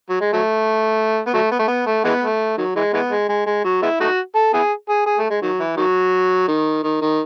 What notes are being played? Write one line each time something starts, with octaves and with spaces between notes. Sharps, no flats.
F#3
G#3
F#3 A3
B3
F#3 A3
B3
A3
B3
A3
E3 G#3 B3
A3
D#3 F#3
E3 G#3
E3 G#3 B3
G#3
G#3
G#3
F#3
G#3 B3 E4
A3 D#4 F#4
A4
B3 E4 G#4
G#4
G#4
A3
G#3
D#3 F#3
E3
D#3 F#3
D#3
D#3
D#3